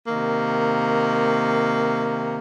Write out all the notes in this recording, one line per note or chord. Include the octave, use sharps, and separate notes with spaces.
C3 D#3 A#3